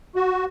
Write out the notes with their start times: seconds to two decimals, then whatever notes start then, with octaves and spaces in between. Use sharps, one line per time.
0.15 F#4